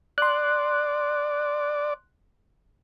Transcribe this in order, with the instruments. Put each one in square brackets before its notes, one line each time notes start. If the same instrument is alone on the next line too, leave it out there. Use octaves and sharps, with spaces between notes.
[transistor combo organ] D5 [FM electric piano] C6 F#6